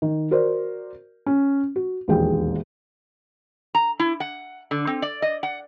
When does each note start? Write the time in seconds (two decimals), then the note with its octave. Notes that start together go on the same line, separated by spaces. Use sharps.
0.02 D#3
0.31 F#4 A#4 C5 D5
1.26 C#4
1.76 F#4
2.08 E1 A#1 D#2 G#4 G5
3.75 A#5
4.00 E4
4.20 F#5
4.71 D3
4.87 C4
5.02 D5
5.22 D#5
5.43 F#5